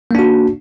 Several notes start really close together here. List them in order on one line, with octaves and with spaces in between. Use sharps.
A#3 D4 F#4